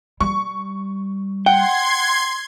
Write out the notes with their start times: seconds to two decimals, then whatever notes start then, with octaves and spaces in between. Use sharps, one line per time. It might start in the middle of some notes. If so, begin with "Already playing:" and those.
0.20 G3 C#6
1.46 F#5 G5 C6 G#6